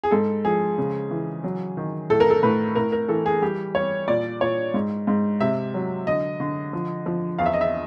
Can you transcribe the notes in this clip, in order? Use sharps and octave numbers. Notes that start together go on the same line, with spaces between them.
G#4
G#2 A4
F3 G#4
C#3
E3
F#3
D#3
A2 A4
A#4
A4
A2 B4
A2 A#4
A#4
E3 A4
G#4
G3 G4
G3 C#5
A#2 D5
A#2 C#5
G#2
G#2
C3 E5
F#3
D3 D#5
D3
F3
F3
E2 F5
E5
D#5
E5